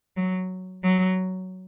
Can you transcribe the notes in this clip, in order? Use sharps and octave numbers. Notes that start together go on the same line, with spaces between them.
F#3
F#3